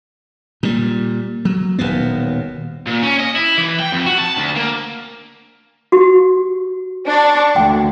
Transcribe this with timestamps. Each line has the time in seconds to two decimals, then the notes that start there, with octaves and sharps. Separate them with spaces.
0.63 A#2 G3
1.45 F#3
1.79 D#1 D#2 B2 B3
2.87 A#2
3.03 C#4
3.20 D#5
3.36 E4
3.58 E3
3.80 G5
3.92 F2
4.06 F#4
4.18 A5
4.37 D2
4.56 A#3
5.92 F#4 G4
7.07 D4 C#6
7.56 D2 G5